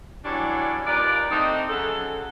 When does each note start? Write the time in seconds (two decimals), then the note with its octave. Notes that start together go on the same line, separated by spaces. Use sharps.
0.25 E3 F#3 G3 C#4 D4 D5
0.86 D#2 D#4 F4 B4 D5
1.31 A3 C4 D4 D#4
1.69 C#3 F#3 F#4 A4